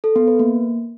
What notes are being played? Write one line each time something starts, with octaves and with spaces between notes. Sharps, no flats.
A4
B3
B4
A#3